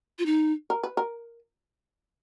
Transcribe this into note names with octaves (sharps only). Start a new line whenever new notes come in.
F4
D#4
A#4
B4
A#4